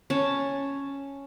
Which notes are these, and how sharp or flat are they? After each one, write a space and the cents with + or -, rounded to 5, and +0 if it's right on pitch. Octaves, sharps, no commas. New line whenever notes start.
C#4 +0 A5 +0